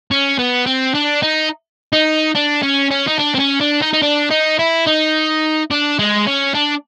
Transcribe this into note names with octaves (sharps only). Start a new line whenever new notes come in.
C#4
B3
C4
D4
D#4
D#4
D4
C#4
C#4
D#4
D4
C4
C#4
D4
D#4
D#4
D4
D#4
E4
D#4
D4
G#3
C#4
D4